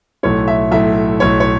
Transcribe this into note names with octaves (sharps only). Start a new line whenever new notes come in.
B1 A2 A3 C#5
E5
B1 A2 A3 E5
B1 A2 A3 C#5
C#5